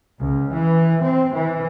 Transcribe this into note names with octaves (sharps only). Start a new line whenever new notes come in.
C#2
E3
C4
E3